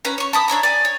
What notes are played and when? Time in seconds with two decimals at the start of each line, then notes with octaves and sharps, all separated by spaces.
0.05 C#4 B4 A#5
0.18 C#5 C#6
0.33 A5 B5 D#6
0.48 D4 C#5 E5 A#5
0.63 D5 G#5
0.85 C#5